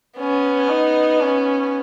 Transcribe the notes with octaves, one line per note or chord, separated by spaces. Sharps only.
B3 C#4
D#4
C#4